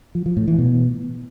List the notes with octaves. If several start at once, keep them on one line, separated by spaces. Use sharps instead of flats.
F3
F3
A2
E3
B2